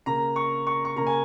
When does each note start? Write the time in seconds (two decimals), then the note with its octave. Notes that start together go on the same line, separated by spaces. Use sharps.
0.06 C#3 A#3 A#5
0.36 C#6
0.67 C#6
0.85 C#6
0.96 C#3 A#3 A#5
1.06 G#5